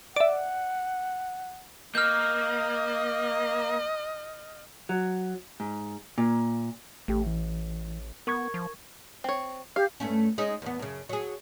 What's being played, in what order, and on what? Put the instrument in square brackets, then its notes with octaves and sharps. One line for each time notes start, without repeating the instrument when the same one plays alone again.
[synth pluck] D5 E5 [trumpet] F#5
[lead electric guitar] A#3 [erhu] D#5 [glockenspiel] F6 G6
[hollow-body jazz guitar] F#3
G#2
A#2
[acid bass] A1 [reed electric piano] A3 G4
[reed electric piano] E3
[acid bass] B3 [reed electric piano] A#4 C#6 G#6
[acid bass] F3
[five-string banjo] C4 C#5
[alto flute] G4 [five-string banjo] F5
[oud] G2 A3 C#4
G#3 C#4 D#4
E2 B3
F#2 C#3
F#3 G#4